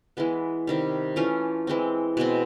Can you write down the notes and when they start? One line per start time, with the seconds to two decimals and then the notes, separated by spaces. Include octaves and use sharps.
0.17 E3 G#3 B3
0.67 C3 D#3 G3
1.16 E3 A3 C#4 F4
1.67 E3 G#3 C4
2.17 B2 G#3 C4